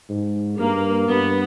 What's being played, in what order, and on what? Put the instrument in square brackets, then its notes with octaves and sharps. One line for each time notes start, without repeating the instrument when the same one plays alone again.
[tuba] G#2
[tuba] G2 [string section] A#3
[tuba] G2 [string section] B3